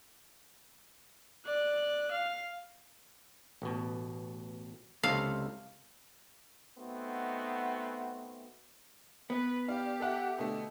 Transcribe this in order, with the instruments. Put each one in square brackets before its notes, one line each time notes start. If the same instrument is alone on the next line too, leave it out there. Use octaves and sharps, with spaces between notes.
[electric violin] D5 F#6
F5
[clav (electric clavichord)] A1 B2
[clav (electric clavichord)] C#2 C3 A4 [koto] F5
[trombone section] A3 B3 C4 D#4 F#4
[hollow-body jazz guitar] B3 [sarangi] B4
[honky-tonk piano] D4 F5 [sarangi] G4
[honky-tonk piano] A4 E5 F#5
B2 D3 A3